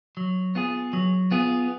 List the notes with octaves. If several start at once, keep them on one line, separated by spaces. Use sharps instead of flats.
F#3
B3 F4 G#4
F#3
B3 F4 G#4